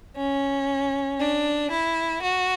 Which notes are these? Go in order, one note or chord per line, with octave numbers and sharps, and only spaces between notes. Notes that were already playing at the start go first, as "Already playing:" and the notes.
C#4
D4
E4
F#4